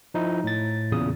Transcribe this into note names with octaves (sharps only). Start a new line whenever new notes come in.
F3 D#4 E4
A2 A6
E2 A#2 C#3 D#6